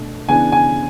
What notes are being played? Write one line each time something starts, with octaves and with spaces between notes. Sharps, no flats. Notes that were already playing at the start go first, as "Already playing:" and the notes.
Already playing: B2 A3 D4
C#3 E3 B3 D4 G#5
G#5